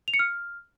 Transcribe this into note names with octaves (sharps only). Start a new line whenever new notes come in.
F7
C#7
F6